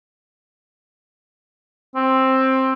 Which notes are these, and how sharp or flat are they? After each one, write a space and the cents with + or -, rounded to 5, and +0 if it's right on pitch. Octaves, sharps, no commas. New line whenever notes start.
C4 +10